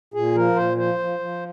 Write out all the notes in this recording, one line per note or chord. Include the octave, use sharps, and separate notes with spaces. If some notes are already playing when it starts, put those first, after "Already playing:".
A#2 G#4
F3 A#4
A#2 C5
F3 C5
F3
F3